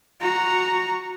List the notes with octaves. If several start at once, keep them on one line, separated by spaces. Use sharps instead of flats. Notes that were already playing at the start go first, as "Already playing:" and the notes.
F#4 A#5